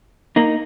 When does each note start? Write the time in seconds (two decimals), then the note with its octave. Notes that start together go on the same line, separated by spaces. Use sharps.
0.36 A#3 D#4